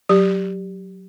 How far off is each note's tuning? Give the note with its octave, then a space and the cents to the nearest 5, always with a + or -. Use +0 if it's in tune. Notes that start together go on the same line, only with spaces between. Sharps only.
F#3 +0 G4 +0